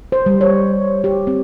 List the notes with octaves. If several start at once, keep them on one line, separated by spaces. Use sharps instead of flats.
C5
G3
C#5
G4
C4